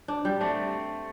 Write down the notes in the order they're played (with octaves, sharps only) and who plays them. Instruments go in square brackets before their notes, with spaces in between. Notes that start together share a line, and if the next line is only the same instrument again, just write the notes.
[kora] D4
G3
[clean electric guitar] A3 C4 [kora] D4